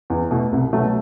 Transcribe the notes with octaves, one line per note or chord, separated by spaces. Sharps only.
E2
B2 A3
C2
B2 F#3 A3